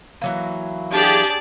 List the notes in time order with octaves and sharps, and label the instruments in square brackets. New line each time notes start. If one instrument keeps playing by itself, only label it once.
[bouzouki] E3 F#3 A#3
[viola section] D4 G4 G#4 [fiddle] D5 A5